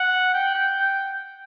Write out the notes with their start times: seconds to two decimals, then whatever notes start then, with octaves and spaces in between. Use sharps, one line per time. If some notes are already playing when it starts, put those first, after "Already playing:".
Already playing: F#5
0.33 G5
0.54 G5